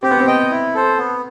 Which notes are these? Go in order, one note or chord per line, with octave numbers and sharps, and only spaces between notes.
C4 G4
B3
C4
D#5 G5
E4
A4 C5
B3